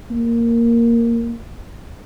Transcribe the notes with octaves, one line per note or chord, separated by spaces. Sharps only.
A#3